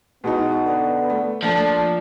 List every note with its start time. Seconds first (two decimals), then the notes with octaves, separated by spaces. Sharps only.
0.24 B2 G#3 B3 D#4
0.65 D3
1.10 A3
1.43 F3 A3 A#3 D4 A5